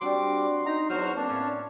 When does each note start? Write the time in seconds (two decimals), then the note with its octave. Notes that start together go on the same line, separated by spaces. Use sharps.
0.01 G3 C4 D4 F#4 C6 D6
0.66 D#4 A#5
0.90 E2 F#3 B3 F#4 C5 F6
1.16 A#3 C4 D4
1.29 A2 C#4